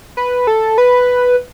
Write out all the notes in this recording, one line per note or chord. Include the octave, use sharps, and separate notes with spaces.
B4
A4
B4